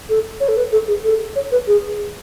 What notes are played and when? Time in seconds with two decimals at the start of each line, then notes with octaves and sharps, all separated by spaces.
0.09 A4
0.40 C#5
0.48 A4
0.57 B4
0.72 A4
0.88 G#4
1.04 A4
1.36 C#5
1.52 B4
1.67 G#4